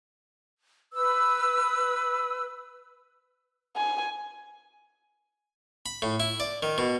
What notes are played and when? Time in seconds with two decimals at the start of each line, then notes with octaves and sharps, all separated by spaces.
0.94 B4 E6
3.77 G#5
5.86 B5
6.02 A2
6.20 E4
6.40 D5
6.63 D#3
6.78 B2